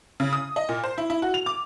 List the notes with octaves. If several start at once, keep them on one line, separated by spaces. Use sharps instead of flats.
C#3
D#6
D#5
A#2
C5
E4
E4
F#4
F7
D6